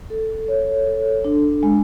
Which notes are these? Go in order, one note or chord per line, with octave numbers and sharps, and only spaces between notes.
A4
C#5
A4
D4
G#3